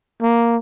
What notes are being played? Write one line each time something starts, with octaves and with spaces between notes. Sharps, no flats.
A#3